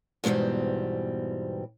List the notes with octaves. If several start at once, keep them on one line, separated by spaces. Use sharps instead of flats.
E2 G#2 B2 G3 C4